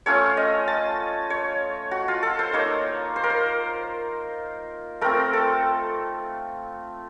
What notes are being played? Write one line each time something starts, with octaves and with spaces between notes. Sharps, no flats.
A3 C#4 F4 C#5
D#5
A5
C#5
F#4
F4
A4
C5
A#3 D#4 C#5
C5
A#4
C5
A3 C4 F4 A#4
A4